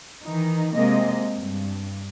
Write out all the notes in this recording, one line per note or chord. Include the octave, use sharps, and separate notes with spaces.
D#3 E3 D#4
C3 G#3 A#3 D#5
G2